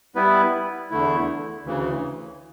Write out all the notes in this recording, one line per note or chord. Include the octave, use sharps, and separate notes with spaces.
G3 B3 E4 B4
E2 D3 A3 E4
D2 C#3 E3